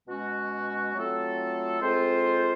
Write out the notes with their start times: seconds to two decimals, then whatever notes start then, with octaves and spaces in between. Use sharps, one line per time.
0.08 B2 G#3 C#4 F#4
0.95 F#3 A3 C4 F4 A4
1.81 G#3 C4 F4 A4 C5